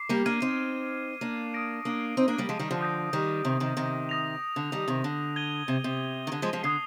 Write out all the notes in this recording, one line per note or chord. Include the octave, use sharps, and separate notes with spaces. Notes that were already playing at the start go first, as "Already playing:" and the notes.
Already playing: D6 C7
G3 A#3
A#3 D4 F6 G#6 D#7
C4 D#4
A#3 D4
D#6 A#6 D7
A#3 D4
C4 D#4
A#3 D4
G3 A#3
F3 G#3
D#3 G3
D3 F3
D#6 G6 A#6
D#3 G3
C3 D#3
C3 D#3
C3 D#3
D#6 A#6 F7
D3
D#3 G3
C3 D#3
D3
G#6 D#7 G7
C3
C3
D#3
D3
F3 G#3
F3 G#3
D3 D#6 G#6 C7